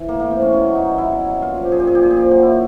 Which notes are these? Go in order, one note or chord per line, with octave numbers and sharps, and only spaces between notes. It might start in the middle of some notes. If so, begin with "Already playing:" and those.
Already playing: E3
A2 A#3
A2 A#3
C4
E3 C#4
B2 C#4
F#3
D#4
F#3
B2 E4
B2
F#3
A#2 F4
F3
G4
F3 G#4
G4
A#2 G#4
G4
A#2 G#4
G4
F3
F#3 G4
E4